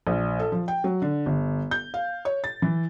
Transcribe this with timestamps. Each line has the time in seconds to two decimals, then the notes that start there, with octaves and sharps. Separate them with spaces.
0.07 A#1
0.39 A4
0.52 F3
0.68 G5
0.84 F#3
1.02 D3
1.26 G1
1.71 G6
1.94 F5
2.25 C#5
2.44 A6
2.62 E3